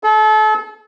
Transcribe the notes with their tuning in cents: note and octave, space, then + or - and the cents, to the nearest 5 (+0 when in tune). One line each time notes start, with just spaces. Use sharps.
A4 -35